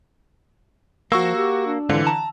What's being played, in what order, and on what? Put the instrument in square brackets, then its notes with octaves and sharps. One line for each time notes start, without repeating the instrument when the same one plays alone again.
[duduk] F3 [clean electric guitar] A#3 [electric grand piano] F#4 C#6 E6
[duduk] G4
D4
[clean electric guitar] G#2 C4 F4 [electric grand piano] D3 E3
[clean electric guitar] A5 [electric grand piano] A#5